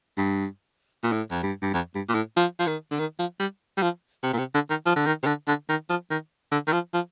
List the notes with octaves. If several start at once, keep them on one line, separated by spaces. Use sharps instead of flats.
G2
A#2
A2
F2
G2
G2
F2
G2
A#2
A2
F3
F3
D#3
D3
D#3
F3
G3
G3
F3
C3
A#2
C3
D3
D#3
F3
D3
D#3
C3
D3
D3
D#3
F3
D#3
D3
D#3
F3
F3